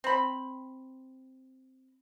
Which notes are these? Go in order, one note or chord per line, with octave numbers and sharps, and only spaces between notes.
C4 B5